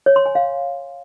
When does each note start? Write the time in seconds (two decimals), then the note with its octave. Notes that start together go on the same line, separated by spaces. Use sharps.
0.06 C#5
0.16 C6
0.26 G#5
0.35 F5